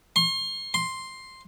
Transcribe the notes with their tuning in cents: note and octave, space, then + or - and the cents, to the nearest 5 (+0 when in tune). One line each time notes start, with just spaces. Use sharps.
C6 +35
C6 +5